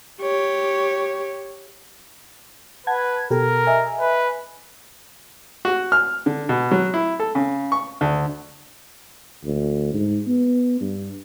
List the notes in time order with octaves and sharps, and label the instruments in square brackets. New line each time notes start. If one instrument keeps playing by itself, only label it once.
[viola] G4 C#5
[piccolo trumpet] B4 [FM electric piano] F#5 A5 G#6
[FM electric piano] B2 G4 A4 [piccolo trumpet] A#4
[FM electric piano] D#5 E5 G#5
[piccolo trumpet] B4
[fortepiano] F#4
F6
D3
B2
F#3
E4
A4
C#3
C#6
D2
[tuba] D2
G#2
B3
G2